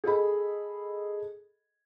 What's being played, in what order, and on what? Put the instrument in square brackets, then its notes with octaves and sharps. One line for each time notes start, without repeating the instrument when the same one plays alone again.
[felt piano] G#4 A4 D#5 B5